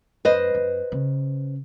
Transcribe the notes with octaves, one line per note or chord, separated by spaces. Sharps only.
F#2 B4 C5 D#5
F#2
C#3